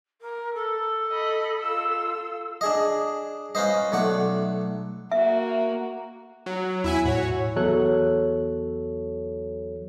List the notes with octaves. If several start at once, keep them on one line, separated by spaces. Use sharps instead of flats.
A#4
A4
D#5 B5
F4 E6
D4 G#4 D#5
C#4 F4 B4 C5 D#5
B1 A3 D5 F#5
A#3 F#4 E5
F#3
E2 E4 E5 G#5
A2 F#4 C#5
E2 F#3 A4 C#5 F#6